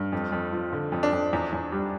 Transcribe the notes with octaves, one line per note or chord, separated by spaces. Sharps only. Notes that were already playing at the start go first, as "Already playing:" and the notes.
Already playing: G2
F2
F2
F3
D3
F2
D4
F2
E2
E2
G3